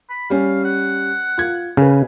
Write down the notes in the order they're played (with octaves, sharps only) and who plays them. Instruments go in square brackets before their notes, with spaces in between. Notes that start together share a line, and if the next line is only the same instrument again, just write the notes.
[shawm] B5
[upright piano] G3 C#4 [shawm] F5
[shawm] F#5
[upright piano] F4 G#6
[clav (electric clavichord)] C#3 [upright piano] G#4 B4